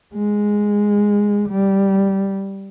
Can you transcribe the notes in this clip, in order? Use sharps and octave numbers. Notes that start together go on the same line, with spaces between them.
G#3
G3